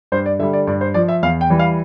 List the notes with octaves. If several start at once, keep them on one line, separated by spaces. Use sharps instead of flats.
G2 C5
D5
D3 G3 E5
D5
G2 D5
C5
F3 D5
E5
E2 F5
G5
E3 G3
F5